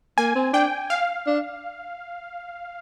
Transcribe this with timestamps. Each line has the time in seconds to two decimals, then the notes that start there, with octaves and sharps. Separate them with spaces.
0.18 A#3 G#5
0.35 C4
0.53 D4 G5
0.90 F5
1.27 D4